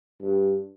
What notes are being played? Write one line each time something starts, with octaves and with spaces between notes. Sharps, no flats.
G2